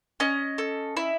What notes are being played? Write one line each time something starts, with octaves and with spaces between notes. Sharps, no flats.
C#4 D#5
A4
E4